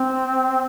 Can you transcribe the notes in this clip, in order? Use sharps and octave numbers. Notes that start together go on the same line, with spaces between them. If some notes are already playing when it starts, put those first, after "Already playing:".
Already playing: C4